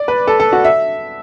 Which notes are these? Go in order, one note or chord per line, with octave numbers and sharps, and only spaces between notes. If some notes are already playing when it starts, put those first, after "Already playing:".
Already playing: D5
B4
A4
A4
F#4
E5